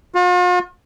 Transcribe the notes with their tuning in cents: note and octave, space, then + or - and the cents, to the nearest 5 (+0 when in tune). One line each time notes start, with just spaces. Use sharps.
F4 +45